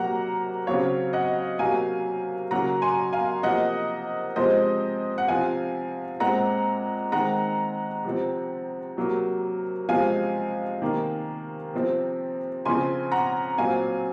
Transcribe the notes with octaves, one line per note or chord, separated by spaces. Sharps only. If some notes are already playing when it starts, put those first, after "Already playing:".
Already playing: C3 F#3 A#3 F#5 A#5
C#3 F#3 C4 C#5 F5
D#5 F#5
C3 F#3 A#3 F5 G#5
C#3 F#3 A#3 F#5 A#5
G#5 C6
F5 G#5
C3 F3 A#3 D#5 F#5
C3 F3 G#3 C4 C5 D#5
F#5
C3 F3 C4 F5 G#5
A#2 G#3 C4 F#5 A#5
D#3 G#3 C4 F#5 A#5
C3 F3 C4
C3 F#3 A#3
C3 F3 G#3 C4 F5 G#5
C3 D#3 A#3
C3 F3 C4
C#3 F3 C4 G#5 C6
F#5 A#5
A#2 F#3 C4 F5 G#5